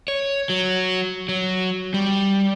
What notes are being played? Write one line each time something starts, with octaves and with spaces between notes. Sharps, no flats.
C#5
F#3
F#3
G3